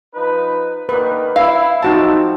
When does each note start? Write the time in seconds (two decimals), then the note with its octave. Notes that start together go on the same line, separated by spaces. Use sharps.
0.14 F3 D#4 B4
0.89 D3 D#3 A#3 B4
1.36 E4 F5
1.83 F3 C4 D#4 F#4 A5